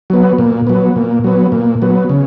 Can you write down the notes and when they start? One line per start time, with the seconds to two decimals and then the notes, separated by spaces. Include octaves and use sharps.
0.10 F#3 B3
0.38 A#2
0.67 F#3 B3
0.96 A#2
1.24 F#3 B3
1.52 A#2
1.82 F#3 B3
2.09 C#3